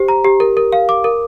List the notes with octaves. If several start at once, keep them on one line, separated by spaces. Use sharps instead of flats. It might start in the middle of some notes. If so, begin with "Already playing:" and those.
Already playing: G4 C5
A#5
G4
A#4
A#4
F5
D6
A#4